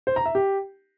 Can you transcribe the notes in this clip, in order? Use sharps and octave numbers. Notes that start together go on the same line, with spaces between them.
C5
A#5
E5
G4